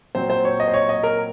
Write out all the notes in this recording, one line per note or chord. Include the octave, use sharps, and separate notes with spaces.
A#2 F#3 C4 C5
C5
C#5
D#5
C5
C#5
D#5
A#4